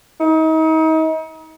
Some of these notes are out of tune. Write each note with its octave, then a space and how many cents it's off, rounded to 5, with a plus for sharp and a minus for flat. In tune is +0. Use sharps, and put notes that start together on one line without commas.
D#4 +35